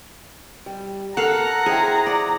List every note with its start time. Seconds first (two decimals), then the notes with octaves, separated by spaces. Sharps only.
0.66 G3
1.17 A4 A#4 F5 F#5 A#5
1.66 F3 E4 G#4 G5
2.06 D5